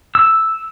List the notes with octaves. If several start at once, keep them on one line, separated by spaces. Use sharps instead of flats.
E6